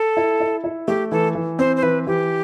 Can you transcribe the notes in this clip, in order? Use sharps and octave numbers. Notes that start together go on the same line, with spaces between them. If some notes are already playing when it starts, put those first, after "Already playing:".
Already playing: A4
E4
E4
E4
A3 G4
E3 A4
E3
C4 C5
C5
E3 B4
E3 G4